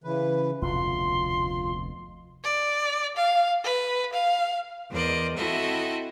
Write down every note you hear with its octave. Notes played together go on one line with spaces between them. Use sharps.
C#3 E3 B4
F1 D2 B2 F4 C6
D5
F5
B4
F5
E2 A#4 C5 D5 D#5
C4 E4 F#4 A4 D#5 E5